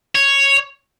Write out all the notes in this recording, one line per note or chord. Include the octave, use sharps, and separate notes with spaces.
C#5